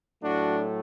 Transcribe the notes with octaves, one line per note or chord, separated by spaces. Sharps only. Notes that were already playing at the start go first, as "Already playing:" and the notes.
A2 F#3 A3 D4 F#4